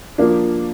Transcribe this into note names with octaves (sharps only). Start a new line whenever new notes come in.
F3 A#3 D4